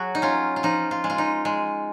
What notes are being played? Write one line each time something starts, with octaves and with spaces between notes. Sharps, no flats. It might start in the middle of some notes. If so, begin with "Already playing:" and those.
Already playing: F#3 F#4 G#4
D#4
C#4 F4
F4
F3 D#4
F4
G#3
F4
D#4
G#3